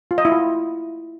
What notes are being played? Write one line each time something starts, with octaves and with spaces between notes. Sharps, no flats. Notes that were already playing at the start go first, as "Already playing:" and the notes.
F4
D#5
E4
F4